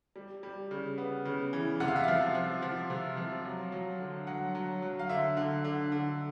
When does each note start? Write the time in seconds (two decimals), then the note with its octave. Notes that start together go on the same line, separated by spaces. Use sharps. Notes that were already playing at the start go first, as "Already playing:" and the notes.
0.16 G3
0.43 G3
0.71 C#3
0.98 B3
1.25 C#3
1.53 E3
1.80 C3 F#5
1.88 F5
1.96 E5
2.04 F3 F5
2.35 F3
2.62 F3
2.90 C3
3.17 F3
3.45 F#3
3.72 F#3
4.00 D3
4.27 F#3 F#5
4.55 F#3
4.82 F#3
4.99 F5
5.09 D3 E5
5.37 D3
5.64 D3
5.92 D3